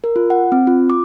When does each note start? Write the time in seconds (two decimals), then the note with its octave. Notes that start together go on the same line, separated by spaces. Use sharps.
0.04 A#4
0.16 F4
0.30 F#5
0.52 C4
0.67 F4
0.90 D6